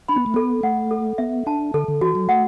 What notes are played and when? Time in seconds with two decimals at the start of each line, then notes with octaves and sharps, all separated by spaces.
0.08 D4 B5
0.16 B3
0.26 A3
0.34 B3 A4
0.63 A3 F#5
0.91 A4
1.18 B3 E5
1.46 D4 A5
1.74 D3 A4
1.88 D3
2.01 E3 F#4
2.15 F#3
2.29 A3 F#5